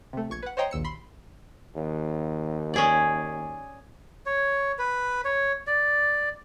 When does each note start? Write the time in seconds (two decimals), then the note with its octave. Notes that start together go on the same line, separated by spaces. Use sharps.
0.13 C3 A3
0.30 A#1 C#6 G#6
0.43 B4 F#5
0.57 C5 C#5 D#5 G5 A#5 C6
0.71 A#1 D#2 E6 C#7
0.84 B5 C6
1.76 D#2
2.74 C#4 G#4 D5
4.26 C#5
4.79 B4
5.25 C#5
5.67 D5